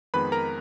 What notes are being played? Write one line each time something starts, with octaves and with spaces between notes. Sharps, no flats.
F2 D#3 G#3 B3 B4 B5
A#4 A#5